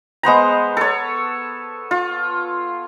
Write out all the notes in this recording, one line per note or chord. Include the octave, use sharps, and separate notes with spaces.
G#3 B3 C5 A#5
A4 C#5
F4